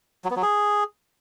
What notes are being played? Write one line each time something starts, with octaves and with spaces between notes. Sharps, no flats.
F#3
B3
F#3
G#4